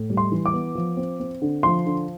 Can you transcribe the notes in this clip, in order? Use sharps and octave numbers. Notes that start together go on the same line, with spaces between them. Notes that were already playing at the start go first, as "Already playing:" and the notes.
Already playing: A2
G3
C6
E3
D6
B3
F3
C4
C4
D3
F3 C6
D3